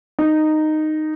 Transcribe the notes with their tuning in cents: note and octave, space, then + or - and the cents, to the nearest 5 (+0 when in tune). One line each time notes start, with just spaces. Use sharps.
D#4 -10